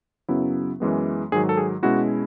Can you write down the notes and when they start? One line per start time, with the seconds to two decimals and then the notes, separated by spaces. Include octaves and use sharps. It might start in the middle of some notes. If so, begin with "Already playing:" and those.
0.28 F#2 C#3 F#3 B3 E4
0.80 F#2 E3 G#3 B3
1.32 G#2 D#3 F#3 G#4
1.49 A4
1.57 G#4
1.83 B2 G#3 C#4 E4 F#4